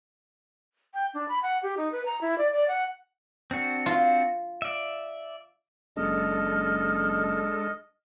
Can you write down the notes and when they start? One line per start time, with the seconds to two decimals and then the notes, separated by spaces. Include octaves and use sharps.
0.94 G5
1.14 D4
1.29 B5
1.43 F#5
1.63 G4
1.77 D#4
1.92 B4
2.06 A#5
2.21 E4
2.38 D5
2.52 D5
2.68 F#5
3.51 C4 D4 F#4
3.86 F4
4.62 D5 E5
5.96 F#1 G#3 D4 A4 D#5 F6